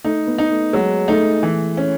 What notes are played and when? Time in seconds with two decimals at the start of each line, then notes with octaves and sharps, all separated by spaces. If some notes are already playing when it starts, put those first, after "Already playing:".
0.04 A3 D#4
0.27 B3
0.38 D#4
0.50 A3
0.73 F#3 G#3
1.08 A3 D#4
1.43 E3
1.77 C#4